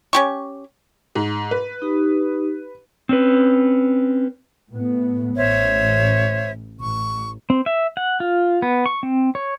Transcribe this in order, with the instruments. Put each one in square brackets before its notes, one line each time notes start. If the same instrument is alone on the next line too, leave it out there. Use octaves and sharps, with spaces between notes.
[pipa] C#4 G4 C#6
[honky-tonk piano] G#2
B4
[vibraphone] D#4 G4
[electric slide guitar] C4 C#4 B4
[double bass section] A2 B3
[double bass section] A1 [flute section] C5 C#5 E5
[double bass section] A1 [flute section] C#6
[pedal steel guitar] C4
E5
F#5
F4
B3
C#6
C4
C#5